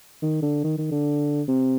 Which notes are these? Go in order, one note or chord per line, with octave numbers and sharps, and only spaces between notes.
D#3
D3
D#3
D#3
D3
C3